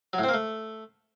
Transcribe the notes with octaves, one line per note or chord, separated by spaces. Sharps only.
F#3
A2
C4
A#3
A3